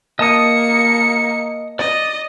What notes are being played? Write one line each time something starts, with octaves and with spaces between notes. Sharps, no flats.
A#3 D#5 A5 D#6 C#7
D5 D#5